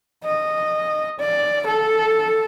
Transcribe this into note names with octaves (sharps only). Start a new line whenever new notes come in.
D#5
D5
A4